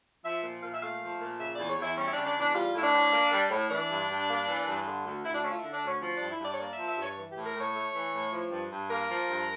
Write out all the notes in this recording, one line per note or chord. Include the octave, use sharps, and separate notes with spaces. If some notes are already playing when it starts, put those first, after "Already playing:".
F3 E5
A#2
A#2 F5
E5
A3 F5
F3
A#2
C#3 E5
E2 D5
C#5
E2 E4
G3 C#4
E4
C#3 D4
D4
E2 D4
G3 F4
A2 E4
D4
A2
A#3
G3
A2
E3 D4
G2
G2
A#3
E3
G2
D3
D2
D2 E4
D4
A3 C#4
F4
E4
D3
D4
D2 C#4
F3 C#4
G2 D4
E4
G2
D5
C#5
A#3 D5
F3 E5
E5
G2
C#5
E3
A2 G4
A#4
A2
C#5
A3
E3
A2
F3
G2
G2
A#3 A#4
F3
G2